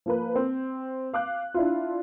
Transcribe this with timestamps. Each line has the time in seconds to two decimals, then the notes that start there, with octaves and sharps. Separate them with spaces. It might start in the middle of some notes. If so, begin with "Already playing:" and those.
0.06 F3 A#3 B4
0.35 C4
1.14 F5 D6 F#6
1.54 D4 E4 F4